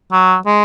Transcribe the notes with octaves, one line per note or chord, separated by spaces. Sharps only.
F#3
G#3